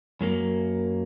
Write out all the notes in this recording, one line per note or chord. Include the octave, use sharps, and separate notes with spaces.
F#2 F#3 A#3